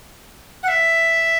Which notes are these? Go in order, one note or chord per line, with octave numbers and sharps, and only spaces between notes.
F#5
E5